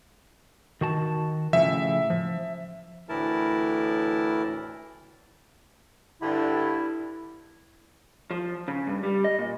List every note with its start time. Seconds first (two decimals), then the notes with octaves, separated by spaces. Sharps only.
0.81 D#3 F#4 A5
1.53 A2 C#3 F3 E5
2.10 F3
3.09 D2 A2 E3 E4 A#4 A5
6.21 G2 D3 E4
8.31 F3
8.68 C#3
8.87 G2
9.03 G3
9.24 D#5
9.39 A#2